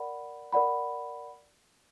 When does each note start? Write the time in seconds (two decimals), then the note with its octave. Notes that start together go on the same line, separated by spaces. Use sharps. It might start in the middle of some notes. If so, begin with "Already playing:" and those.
Already playing: A#4 D5 F#5 B5
0.53 A#4 D5 F#5 B5